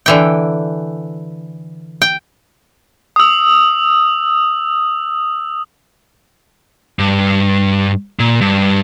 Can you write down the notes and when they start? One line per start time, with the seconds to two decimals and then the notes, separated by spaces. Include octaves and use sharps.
0.06 D3 E3 G5
2.02 G5
3.16 D#6 E6
6.99 G2
8.19 A#2
8.41 G2